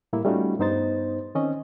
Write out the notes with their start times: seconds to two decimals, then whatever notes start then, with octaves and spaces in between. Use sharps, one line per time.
0.13 A2 G3 A#3 E4
0.25 G3 A3 C#4 D#4 F4 F#4
0.59 G2 B3 D#4 C5 A6
1.35 D#3 C4 C#4 D#5